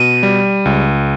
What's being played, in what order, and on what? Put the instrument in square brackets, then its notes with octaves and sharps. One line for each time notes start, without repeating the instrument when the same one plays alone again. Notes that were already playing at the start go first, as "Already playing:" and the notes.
Already playing: [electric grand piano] B2 [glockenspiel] D#7
[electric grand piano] G3
C#2